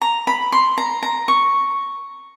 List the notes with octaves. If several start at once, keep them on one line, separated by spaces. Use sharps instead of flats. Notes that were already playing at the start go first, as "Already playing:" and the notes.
A#5
B5
C6
A#5
A#5
C#6